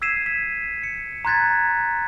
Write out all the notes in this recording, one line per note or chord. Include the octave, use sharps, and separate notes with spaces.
E6 G#6 B6 C7 D#7 E7
B6
C#7
A#5 C6 F#6 G#6 A6 B6